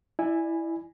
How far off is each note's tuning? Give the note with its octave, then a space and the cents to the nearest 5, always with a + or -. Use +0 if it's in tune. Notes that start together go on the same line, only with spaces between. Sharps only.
E4 +0 D5 +35 G#5 -5